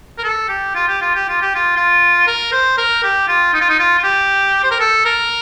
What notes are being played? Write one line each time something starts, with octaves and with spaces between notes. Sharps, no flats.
A#4
A4
G4
F4
G4
F4
G4
F4
G4
F4
F4
A#4
C5
A#4
G4
F4
D#4
F4
D#4
F4
F4
G4
C5
A#4
A4
A#4